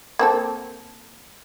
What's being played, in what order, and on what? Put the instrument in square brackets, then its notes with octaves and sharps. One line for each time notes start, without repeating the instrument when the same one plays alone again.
[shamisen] A#3 C4 A4